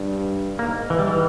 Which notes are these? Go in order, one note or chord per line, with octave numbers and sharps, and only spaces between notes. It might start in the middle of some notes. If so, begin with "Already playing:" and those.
Already playing: G2
G#2 A#3
E3
G3
E3